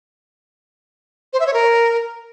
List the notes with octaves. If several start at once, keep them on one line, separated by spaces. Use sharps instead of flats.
C5
E5
C#5
A#4